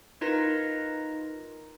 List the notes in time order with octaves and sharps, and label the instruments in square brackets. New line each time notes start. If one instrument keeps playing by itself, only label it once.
[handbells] D#4 F4 A#4 B4 A#5 A#6